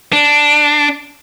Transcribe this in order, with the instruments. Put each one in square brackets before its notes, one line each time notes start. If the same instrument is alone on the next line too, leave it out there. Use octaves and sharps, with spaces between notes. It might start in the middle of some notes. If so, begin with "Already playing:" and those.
[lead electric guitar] D4